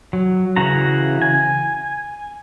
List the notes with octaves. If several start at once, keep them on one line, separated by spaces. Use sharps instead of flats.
F#3
C#3 E3 F#4 A#5
G#5